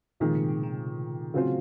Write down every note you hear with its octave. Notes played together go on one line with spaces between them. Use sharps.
F2 A#2 D#3 G#3
C3
C#3
D#3
C#3 F#3 C4 F4 C5